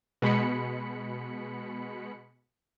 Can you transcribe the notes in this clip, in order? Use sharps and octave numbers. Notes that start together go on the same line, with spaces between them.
B2 G#3 B5 C#7